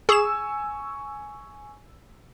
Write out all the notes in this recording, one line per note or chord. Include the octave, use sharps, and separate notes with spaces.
G#4 G#5 C#6 E6 E7